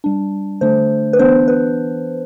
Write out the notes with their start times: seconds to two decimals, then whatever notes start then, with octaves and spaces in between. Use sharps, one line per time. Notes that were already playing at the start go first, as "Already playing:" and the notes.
0.04 G3 D4
0.61 D3 A3 D4 C5
1.13 B4
1.19 E3 B3 D4 C5
1.48 B4